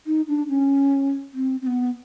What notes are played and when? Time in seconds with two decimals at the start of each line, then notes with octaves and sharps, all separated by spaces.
0.07 D#4
0.28 D4
0.49 C#4
1.34 C4
1.62 C4
1.67 B3